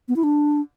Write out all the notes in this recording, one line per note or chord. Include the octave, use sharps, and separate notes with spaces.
B3
E4
D4